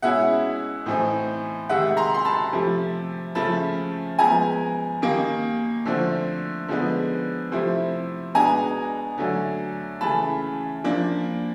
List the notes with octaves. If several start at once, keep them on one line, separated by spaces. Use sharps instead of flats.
B2 G#3 C#4 E4 E5 F#5
A2 E3 A3 C4 D#4
C3 D#3 G#3 E5 F#5
A#5 C6
C6
A5 B5
C3 F3 A3
C#3 F3 A3 A5 B5
F3 G#3 B3 G#5 A#5
D#3 G3 A#3 D#4
D3 F3 A3 C4
D3 F3 G#3 B3 D#4
C3 F3 A3 C4 E4
B2 G#3 B3 D4 G#5 A#5
D3 F#3 A3
C#3 E3 A3 A5 B5
F3 A#3 D4